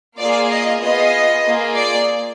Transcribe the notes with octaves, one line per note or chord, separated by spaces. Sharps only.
A#3 F4 G#4 D5
D#5
B3 F4 G#4 D#5
A#3 F4 G#4
D5